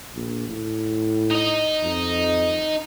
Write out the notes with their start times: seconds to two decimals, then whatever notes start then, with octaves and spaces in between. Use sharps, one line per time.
0.15 A#1
0.48 A2
1.31 D#4 D#5
1.83 F2